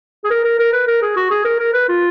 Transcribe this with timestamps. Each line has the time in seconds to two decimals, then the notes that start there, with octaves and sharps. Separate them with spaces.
0.24 G#4
0.30 A#4
0.44 A#4
0.59 A#4
0.73 B4
0.87 A#4
1.02 G#4
1.16 F#4
1.31 G#4
1.45 A#4
1.59 A#4
1.73 B4
1.89 F4